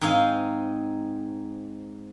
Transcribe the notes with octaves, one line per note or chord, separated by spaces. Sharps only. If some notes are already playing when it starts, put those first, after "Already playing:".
G#2 C4 D#4 F5 G#5